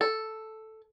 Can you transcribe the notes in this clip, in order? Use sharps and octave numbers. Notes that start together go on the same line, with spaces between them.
A4